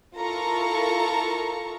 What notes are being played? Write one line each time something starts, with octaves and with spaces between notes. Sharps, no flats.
E4 F4 A4 A#4 A#5 C#6